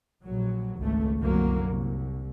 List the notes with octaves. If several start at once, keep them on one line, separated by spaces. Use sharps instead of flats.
A#1 F#3
G#1 C#2 A3
C2 F#2 D3 F#3 A#3
C2